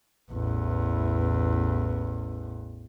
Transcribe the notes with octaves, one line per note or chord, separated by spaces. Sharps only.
A1 E2